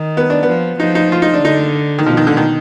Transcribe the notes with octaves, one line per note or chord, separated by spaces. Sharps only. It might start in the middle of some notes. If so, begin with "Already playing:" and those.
Already playing: D#3
B3
D4
B3
F3
F3 D#4
D#4
F4
D#4
D4
D3 D#4
D#3
B2 F3
D#3
D3
D#3